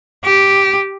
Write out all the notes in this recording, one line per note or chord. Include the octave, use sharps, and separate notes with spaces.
G4